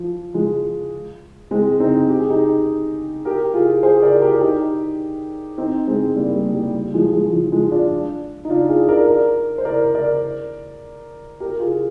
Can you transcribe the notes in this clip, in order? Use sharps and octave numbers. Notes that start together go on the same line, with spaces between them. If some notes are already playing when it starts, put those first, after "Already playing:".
Already playing: F3
F3 G#3
G#3 C4
C4 D#4
G4
G#4
D#4 G4
G4 A#4
F4 G#4
G#4 C5
A#4 D5
G4 A#4
D#4 G4
C4 D#4
G#3 C4
G3 A#3
G3
G3
G3
F3 G#3
F3 G#3
F3
F3 G#3
D4 F4
D#4
D4 F4
F4 G#4
A#4 D5
A#4 D5
C5
A#4 D5
A#4 D5
G4 A#4
F4 G#4